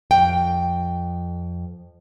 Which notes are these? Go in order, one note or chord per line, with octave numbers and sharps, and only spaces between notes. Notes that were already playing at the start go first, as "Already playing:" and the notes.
F2 G5